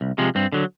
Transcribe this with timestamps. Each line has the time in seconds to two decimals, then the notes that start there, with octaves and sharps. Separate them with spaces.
0.01 C2
0.18 C3 F3 G#3
0.35 G2 C4
0.52 D3 F#3